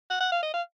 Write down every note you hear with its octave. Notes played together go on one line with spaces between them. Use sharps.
F#5
F#5
F5
D#5
F5